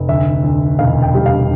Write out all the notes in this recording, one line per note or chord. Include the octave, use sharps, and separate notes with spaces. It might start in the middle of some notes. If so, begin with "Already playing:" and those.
Already playing: F1
D2 E5
D2
E1 F5
G5
G3
F5